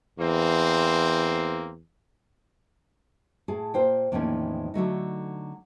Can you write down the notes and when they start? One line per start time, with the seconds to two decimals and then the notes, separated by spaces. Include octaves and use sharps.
0.19 E2 A#3 C4 C5
3.48 A2 G#4 A4 G#5
3.74 A#2 F4 C5 G5
4.12 E2 A2 D#3 F3 A#3 C#4
4.74 D3 F#3 A3 D#4